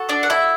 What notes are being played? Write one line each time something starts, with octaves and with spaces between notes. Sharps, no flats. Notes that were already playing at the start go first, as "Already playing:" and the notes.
Already playing: F#4 A4
D4 D5
F#5
E4 E5